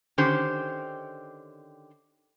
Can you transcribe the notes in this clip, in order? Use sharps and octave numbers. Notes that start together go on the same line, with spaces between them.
D3 D#3 C#4 G4 C5